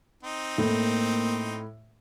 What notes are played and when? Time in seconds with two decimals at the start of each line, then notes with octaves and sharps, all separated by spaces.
0.23 C4 D#4
0.58 A2 A#3